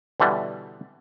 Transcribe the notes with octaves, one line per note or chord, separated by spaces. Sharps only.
B2 D3 E3 G3